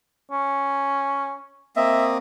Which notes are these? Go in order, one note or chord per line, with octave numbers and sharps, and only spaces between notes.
C#4
A#3 C4 D#5 E5